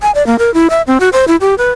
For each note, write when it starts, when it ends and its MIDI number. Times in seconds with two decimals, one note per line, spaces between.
0.02 0.11 80
0.15 0.25 74
0.27 0.36 58
0.39 0.53 70
0.54 0.67 64
0.70 0.82 76
0.87 0.98 60
1.00 1.09 66
1.13 1.25 72
1.28 1.36 64
1.41 1.55 67
1.58 1.70 71